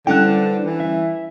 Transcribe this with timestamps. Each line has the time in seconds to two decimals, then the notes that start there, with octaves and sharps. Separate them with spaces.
0.07 D3 G3 C#4 E4 G5 F#6
0.23 D4 B4 C5
0.64 E3
0.80 E5